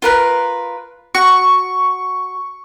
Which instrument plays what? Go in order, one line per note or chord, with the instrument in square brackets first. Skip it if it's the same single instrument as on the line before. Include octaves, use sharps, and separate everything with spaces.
[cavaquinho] F4 A#4 B4
[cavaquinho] F#4 [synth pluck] C#6